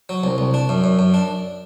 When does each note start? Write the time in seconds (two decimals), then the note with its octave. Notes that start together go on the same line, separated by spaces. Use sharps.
0.09 F#3
0.24 C2
0.38 C2
0.54 D4
0.69 F#2
0.84 F#2
0.99 F#2
1.14 D4